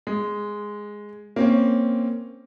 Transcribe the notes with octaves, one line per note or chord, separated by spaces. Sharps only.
G#3
A#3 C4 C#4